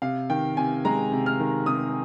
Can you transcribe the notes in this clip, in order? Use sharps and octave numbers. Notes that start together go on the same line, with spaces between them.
C3 F5
D#3 G5
C3 G#5
G#3 A#5
C3
F6
D#3
C3 D#6